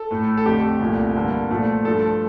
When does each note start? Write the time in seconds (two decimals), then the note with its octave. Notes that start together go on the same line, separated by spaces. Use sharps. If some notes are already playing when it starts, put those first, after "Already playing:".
Already playing: A4
0.11 A2 A3
0.37 A4
0.46 F2 D3 A3 G4
0.80 C2 A#2 A3
1.16 G2 D3 G3 A#3
1.51 A#2 F3 A3
1.85 G2 F3 A3 A4